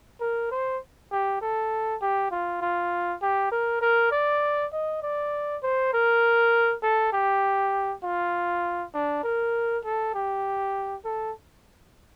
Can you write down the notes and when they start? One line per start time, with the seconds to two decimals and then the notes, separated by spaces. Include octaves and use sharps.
0.21 A#4
0.51 C5
1.12 G4
1.41 A4
2.02 G4
2.31 F4
2.61 F4
3.22 G4
3.52 A#4
3.82 A#4
4.12 D5
4.72 D#5
5.03 D5
5.63 C5
5.93 A#4
6.83 A4
7.13 G4
8.04 F4
8.94 D4
9.24 A#4
9.85 A4
10.14 G4
11.05 A4